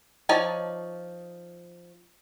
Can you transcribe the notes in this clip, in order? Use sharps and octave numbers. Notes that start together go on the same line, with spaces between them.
F3 D#4 C#5 D5 A5